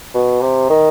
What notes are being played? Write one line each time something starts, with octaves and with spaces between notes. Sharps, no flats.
B2
C3
D#3